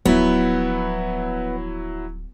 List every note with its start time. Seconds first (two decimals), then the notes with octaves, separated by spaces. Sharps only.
0.05 D1 F3 F#3 B3 E4